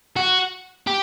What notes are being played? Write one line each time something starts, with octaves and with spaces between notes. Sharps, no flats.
F#4
G4